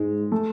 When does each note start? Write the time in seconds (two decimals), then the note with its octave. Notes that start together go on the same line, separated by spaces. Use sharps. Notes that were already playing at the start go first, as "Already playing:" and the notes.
Already playing: G#2 G#3
0.32 A3